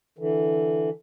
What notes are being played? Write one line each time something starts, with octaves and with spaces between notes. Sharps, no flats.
D3 E3